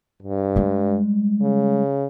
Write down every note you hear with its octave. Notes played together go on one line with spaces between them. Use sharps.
G2
G3 G#3
C#3